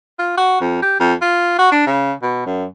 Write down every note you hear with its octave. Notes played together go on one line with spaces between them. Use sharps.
F4
F#4
F2
G4
F2
F4
F#4
D4
C#3
B2
F#2